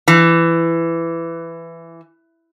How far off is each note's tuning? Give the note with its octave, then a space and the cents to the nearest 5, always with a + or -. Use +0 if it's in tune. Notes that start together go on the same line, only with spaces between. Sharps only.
E3 +15